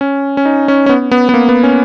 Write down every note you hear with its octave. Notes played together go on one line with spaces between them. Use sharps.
C#4
C#4
D#4
C#4
C#4
B3
B3
B3
A#3
B3
C#4